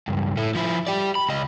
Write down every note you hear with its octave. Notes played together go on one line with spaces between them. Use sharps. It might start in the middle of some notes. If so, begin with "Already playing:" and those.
C#2 G2
A2 A3
F3 E4
G4 D5
B5
C#2 D#5